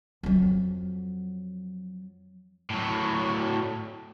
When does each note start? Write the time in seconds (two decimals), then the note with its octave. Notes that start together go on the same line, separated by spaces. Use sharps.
0.23 F2 F#3
2.70 A2 F#3